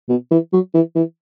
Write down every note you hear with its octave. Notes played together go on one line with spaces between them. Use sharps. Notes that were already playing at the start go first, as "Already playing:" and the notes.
B2
E3
F#3
E3
E3